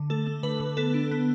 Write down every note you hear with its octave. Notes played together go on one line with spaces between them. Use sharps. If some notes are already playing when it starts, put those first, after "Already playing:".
Already playing: D3
A3 A4
A3
D3 B4
D3
B3 A4
D4
B3